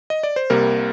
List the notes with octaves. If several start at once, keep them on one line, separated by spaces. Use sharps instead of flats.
D#5
D5
C5
C2 C3 G3 A#3 A#4